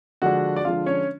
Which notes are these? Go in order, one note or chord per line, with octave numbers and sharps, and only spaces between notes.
D3 F3 G#3 D4 F#4 F#5
D5
D3 F3 G#3 D4 F4 F5
C#4 C#5